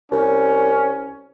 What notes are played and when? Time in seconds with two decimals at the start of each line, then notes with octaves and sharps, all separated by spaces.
0.12 C2 C#4